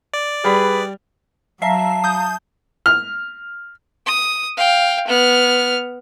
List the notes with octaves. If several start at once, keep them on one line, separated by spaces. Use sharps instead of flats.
D5
G3 G#4 B4
F#3 E5 F5 A5 A#5 C7
D#6 G6
F6
D#6
F5 G5
B3 F6